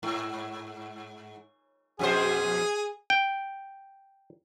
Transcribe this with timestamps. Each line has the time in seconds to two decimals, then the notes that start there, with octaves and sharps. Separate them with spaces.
0.03 G#2
1.99 F2 B2 G#4 C5
3.10 G5